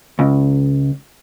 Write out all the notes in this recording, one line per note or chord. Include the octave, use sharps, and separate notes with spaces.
C#2